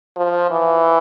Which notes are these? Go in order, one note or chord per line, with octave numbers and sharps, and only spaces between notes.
F3
E3